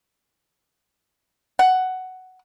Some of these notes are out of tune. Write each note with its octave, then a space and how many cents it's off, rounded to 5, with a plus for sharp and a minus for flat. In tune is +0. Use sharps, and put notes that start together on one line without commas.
F#5 +5